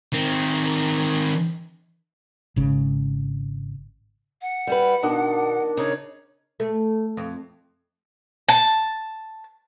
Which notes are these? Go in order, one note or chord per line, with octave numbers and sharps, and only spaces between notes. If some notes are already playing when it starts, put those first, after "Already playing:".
D#3 C4
G#1 C#3
F#5
G3 E4 B4
B2 D#3 D4 D#5
C#3 D#4 C#5
A3
F2
A5